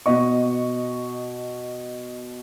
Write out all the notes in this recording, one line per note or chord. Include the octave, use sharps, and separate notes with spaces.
B2 D#5 C#6